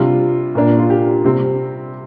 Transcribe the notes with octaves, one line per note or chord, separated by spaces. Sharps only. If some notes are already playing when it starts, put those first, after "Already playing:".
Already playing: C3 G3 D4 F4
A#2 A#3 D4
F4
G4
C3 G3 C4